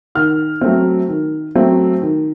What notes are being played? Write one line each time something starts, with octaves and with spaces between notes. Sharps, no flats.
D#3 F6
F#3 A3 C4
D#3
F#3 A3 C4
D#3